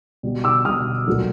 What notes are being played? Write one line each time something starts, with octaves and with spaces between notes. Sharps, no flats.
B2 G3
D6 E6
B2 G3 D#6 F6
A#2 F#3 A3